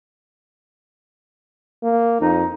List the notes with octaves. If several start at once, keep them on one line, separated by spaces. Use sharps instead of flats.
A#3
F2 D#4